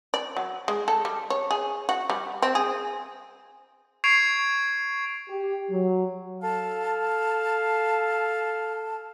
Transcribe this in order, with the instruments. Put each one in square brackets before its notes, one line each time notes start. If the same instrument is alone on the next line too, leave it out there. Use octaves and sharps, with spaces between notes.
[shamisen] D5
F#3
G#3
A4
G3
C#5
G#4
F#4
G3
C4
G#4
[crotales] C#6 G#6 C7 D7 F7
[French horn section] G4
F#3
[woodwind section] A4 F5 A5